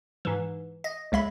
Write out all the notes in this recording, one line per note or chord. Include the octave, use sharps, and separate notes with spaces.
G#2 E3
D#5
C#2 G#3 E5 B5